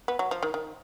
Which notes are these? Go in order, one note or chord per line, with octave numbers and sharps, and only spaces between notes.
B3
F#3
F3
D#3
D#3